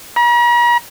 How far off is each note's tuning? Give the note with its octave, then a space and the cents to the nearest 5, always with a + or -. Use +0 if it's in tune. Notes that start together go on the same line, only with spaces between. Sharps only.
A#5 +45